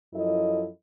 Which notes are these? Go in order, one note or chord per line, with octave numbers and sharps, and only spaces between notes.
F#2 F3 E4 A4 D#5